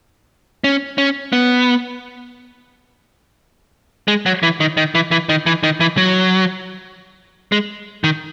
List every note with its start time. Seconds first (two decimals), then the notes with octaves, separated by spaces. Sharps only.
0.64 C#4
0.98 C#4
1.33 B3
4.08 G#3
4.26 F#3
4.43 E3
4.60 D#3
4.77 D#3
4.95 E3
5.11 E3
5.29 D#3
5.46 E3
5.63 D#3
5.80 E3
5.97 F#3
7.52 G#3
8.04 D#3